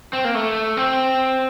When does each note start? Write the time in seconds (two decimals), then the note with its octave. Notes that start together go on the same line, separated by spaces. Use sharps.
0.13 C4
0.25 A#3
0.35 A3
0.77 C4